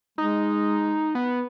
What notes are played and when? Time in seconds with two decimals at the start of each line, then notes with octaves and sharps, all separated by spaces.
0.18 G#3 D#4
1.15 B3